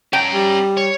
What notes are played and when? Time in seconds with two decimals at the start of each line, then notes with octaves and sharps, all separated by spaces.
0.13 C#4 G5 A#5
0.33 G3
0.77 C#5